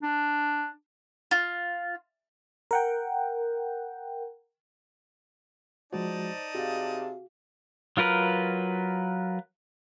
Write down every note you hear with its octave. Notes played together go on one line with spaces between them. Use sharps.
D4
F4
A#4 F#5 G5
F3 G#3 D#4 F#4 C5 D5 A5
C3 F#4 G#4 F5
F#3 F4 A#4 B4 F6